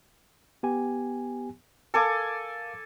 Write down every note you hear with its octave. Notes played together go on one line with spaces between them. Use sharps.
B3 G4 G#5
A4 A#4 F5 G#5 D6